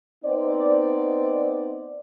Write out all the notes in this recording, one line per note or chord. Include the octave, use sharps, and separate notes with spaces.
B3 C4 D#4 C5 D5